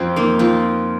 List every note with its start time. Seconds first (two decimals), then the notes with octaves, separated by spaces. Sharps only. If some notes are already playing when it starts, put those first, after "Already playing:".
Already playing: F2 C4 F4
0.16 A#3 D#4
0.39 C4 F4